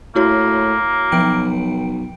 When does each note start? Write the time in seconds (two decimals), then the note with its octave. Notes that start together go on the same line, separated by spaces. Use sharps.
0.16 A2 A#3 E4 F#4 C#5
1.12 B1 F3 G5 D7